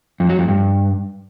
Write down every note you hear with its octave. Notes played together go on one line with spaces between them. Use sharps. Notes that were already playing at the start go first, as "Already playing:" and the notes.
F2
F#3
F2
G2